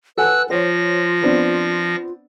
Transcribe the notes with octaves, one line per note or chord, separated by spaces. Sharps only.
A4 B4 F#5 G#5 E6 F#6
F3 F4 C5 C#5 A#6
B3 C4 D4